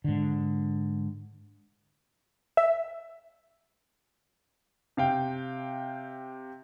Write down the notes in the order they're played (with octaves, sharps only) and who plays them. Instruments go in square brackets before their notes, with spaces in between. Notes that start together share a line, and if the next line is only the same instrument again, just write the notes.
[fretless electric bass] G#2 D3
[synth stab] E5
[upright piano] C3 F5 G5